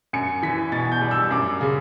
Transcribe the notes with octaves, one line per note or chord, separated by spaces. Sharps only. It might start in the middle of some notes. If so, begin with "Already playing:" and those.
F#2 C#7
E3 B6
B2 A6
G6
G3
E6
F#2 D6
C#3